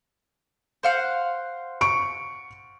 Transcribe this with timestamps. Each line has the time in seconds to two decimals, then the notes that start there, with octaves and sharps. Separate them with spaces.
0.83 C5 F5 F#5
1.81 C#6 D7